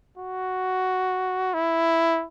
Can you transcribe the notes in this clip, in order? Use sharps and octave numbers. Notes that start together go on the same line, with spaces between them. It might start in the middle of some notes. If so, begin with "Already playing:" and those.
F#4
E4